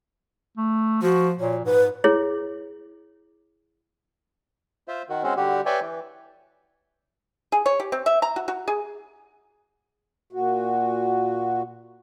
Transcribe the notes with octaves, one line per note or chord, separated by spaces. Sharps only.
A3
F3 F#4
A#2 C#5
G#2 B4
E4 G#4 C#5
F4 C5 E5
D#3 F#4
G#3 C4 C#4 F#4
D3 G3 F#4 G4
B4 C#5 D5 E5 G5 G#5
E3
G#4
C#5
G4
C4
E5
A#5
F#4
F#4
G#4
A#2 F#4